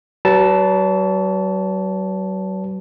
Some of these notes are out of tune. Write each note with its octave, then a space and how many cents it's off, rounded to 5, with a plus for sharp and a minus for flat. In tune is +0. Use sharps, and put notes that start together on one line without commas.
F#3 +40 B4 +5 A5 -5